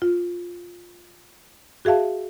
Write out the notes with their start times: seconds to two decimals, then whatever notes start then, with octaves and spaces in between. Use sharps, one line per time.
0.02 F4
1.85 F#4 G#4 E5 F5 A5